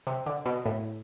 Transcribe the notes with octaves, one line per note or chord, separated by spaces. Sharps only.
C3
D3
B2
A2